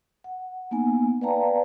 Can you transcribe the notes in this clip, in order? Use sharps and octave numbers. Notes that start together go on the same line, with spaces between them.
F#5
A#3 B3 D#4 G#5
B4 D5 F5 G5 A5 A#5